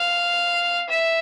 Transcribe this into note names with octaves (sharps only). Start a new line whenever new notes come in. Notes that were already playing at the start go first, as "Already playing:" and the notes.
Already playing: F5
E5